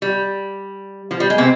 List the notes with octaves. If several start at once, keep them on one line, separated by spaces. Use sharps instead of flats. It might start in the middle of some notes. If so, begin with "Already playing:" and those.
G3
F3
G3
G#3
C3 C4